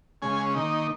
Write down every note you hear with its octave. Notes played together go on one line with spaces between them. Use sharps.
C#3 G#3 C#4 G#5
D#3 A#3 D#4